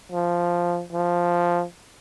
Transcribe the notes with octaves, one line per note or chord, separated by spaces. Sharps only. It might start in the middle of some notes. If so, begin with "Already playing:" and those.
F3
F3